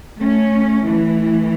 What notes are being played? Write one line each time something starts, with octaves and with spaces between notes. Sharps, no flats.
A3 C#4
E3 A3